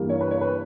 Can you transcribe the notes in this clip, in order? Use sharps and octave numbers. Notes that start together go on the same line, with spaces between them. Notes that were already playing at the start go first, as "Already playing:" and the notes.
Already playing: G2 E3 G3 A#3
C#5
B4
C#5
B4